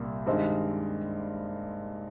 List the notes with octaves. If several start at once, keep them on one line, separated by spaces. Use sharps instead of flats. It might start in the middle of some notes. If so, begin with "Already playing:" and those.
Already playing: C2 A#2 G3
G2 D#3 G#3 C4 D#4